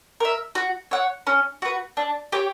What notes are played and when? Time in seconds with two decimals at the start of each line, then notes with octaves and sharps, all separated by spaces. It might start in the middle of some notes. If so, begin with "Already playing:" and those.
0.20 A#4 E5
0.55 F#4
0.91 C#5 F#5
1.27 C#4
1.62 F#4 B4
1.97 D4
2.32 G4 C#5